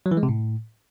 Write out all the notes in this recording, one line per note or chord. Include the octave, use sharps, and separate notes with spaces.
F#3
E3
G#3
C3
A2